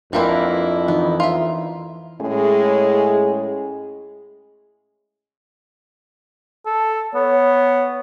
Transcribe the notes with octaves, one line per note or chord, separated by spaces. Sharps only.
F2 E3 A#3 C4 D4 E4 A#4 B4
E3 B3 D#4
F4 E5
A2 G#3 C#4 G#4
A4
B3 C#5